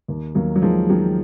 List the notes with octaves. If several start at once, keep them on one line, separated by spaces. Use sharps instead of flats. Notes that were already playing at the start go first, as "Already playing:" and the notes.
D#2
D#2 F#3 A#3
F#3
D#3 F3 G#3
D#3 F#3